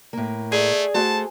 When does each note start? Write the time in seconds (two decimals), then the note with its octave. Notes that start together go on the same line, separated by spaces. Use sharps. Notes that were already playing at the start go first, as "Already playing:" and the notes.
0.13 A2 A#3
0.52 A3 G#4 D5
0.94 A3 F#4 C5 A5